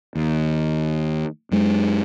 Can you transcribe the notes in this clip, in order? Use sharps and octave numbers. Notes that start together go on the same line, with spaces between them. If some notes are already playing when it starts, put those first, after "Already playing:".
D#2
F#2 G#3